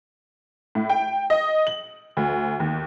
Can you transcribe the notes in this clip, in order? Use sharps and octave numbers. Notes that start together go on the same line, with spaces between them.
A2
G5
D#5
F#7
D2
D#2